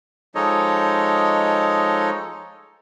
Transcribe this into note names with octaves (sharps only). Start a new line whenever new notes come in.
F3 G#3 D#4 A4 C#5 D#5